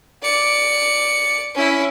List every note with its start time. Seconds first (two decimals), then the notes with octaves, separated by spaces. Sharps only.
0.22 D5 C#7
1.55 C#4 E4